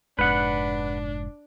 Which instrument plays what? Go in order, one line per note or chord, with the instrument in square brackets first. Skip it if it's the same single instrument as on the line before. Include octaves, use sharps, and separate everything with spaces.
[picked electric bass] F1 G#2 [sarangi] D4 [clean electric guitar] B4 F#5